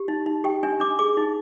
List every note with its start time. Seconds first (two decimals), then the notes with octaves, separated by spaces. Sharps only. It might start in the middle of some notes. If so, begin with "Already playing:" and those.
Already playing: G4
0.08 D#4
0.26 D#4
0.44 G4 G5
0.63 D4 G#5
0.80 D4 D6
0.99 G#4 D6
1.17 D#4